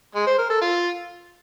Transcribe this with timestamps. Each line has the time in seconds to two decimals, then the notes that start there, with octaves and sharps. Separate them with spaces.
0.15 G#3
0.27 C5
0.38 A#4
0.50 A4
0.62 F4